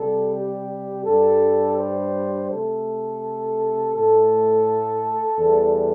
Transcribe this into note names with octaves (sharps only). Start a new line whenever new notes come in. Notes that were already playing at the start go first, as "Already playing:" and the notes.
Already playing: C3 G3 A4
G4
G2 G3 A4
C5
C3 A3 A4
A2 A3 A4
E2 E3 G3